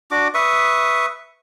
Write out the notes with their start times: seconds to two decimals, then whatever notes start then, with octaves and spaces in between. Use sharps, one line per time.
0.11 D4 F#4 D6
0.34 B4 E5 C#6 D#6